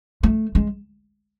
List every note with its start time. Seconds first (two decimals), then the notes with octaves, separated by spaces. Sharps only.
0.23 A3
0.55 G#3